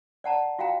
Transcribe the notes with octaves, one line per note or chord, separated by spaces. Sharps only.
D5 F#5 A5 A#5
F4 F#4 F5 G5 A#5